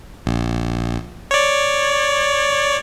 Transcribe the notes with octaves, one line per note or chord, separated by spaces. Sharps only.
A#1
C#5 D5